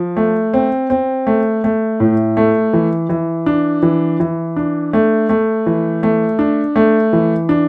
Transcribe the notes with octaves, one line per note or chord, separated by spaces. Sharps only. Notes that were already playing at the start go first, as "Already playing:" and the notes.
Already playing: F3
A3
C4
C4
A3
A3
A2
A3
E3
E3
D4
E3
E3
D4
A3
A3
E3
A3
D4
A3
E3
D4